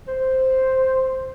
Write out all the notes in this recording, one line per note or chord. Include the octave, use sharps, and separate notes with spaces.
C5